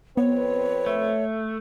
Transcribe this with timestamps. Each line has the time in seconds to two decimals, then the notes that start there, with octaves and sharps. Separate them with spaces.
0.17 F2 B3 C4 B4 C#5
0.86 A3